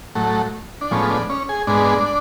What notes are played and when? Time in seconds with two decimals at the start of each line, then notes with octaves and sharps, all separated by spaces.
0.15 A2 F#3 A3
0.81 D4
0.91 A2 F3 G#3 B3 C#4
1.10 D4
1.30 C#4
1.49 G#4
1.67 G#2 G#3 B3 D4